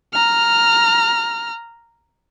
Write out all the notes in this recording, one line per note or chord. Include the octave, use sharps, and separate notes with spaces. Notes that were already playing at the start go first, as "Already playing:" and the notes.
A#5 F6